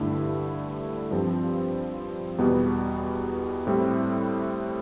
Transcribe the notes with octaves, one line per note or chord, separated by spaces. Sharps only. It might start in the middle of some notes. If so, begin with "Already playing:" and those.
Already playing: G2 D3 A3 E4
G2 F3 C4
E2 B2 G3 B3
A2 G3 C4 E4